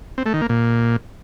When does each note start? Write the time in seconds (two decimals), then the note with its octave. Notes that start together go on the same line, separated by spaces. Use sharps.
0.18 C4
0.26 A3
0.34 D#3
0.41 A#3
0.49 A#2